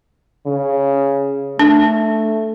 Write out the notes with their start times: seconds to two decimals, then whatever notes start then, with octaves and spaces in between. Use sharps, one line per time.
0.45 C#3
1.59 A3 D4